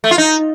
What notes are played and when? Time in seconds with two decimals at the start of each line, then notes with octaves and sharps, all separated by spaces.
0.04 A3
0.11 F4
0.18 D#4